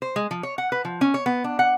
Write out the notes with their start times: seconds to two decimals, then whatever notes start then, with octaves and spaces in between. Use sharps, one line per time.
0.02 C5
0.16 G#3
0.31 F3
0.43 C#5
0.58 F#5
0.72 B4
0.85 F3
1.01 C#4
1.14 C#5
1.26 B3
1.44 D4
1.59 F#5